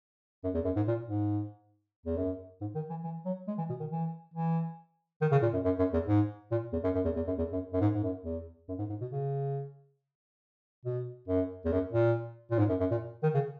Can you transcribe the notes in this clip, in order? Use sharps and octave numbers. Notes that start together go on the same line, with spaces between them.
F#2
E2
F#2
G#2
A#2
G#2
E2
F#2
G#2
D#3
E3
E3
F#3
G#3
E3
B2
D#3
E3
E3
D#3
C#3
A#2
F#2
F#2
F#2
E2
G#2
A#2
E2
F#2
F#2
E2
E2
F#2
E2
F#2
F#2
G#2
G#2
F#2
E2
F#2
G#2
G#2
B2
C#3
B2
F#2
E2
F#2
A#2
A#2
G#2
F#2
F#2
A#2
D#3
C#3